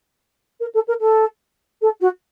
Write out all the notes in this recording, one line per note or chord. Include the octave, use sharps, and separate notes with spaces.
A#4
A4
A#4
A4
A4
F#4